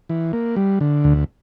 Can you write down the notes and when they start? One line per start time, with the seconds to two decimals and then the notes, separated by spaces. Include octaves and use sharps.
0.09 E3
0.33 A#3
0.56 G3
0.81 D3
1.04 D2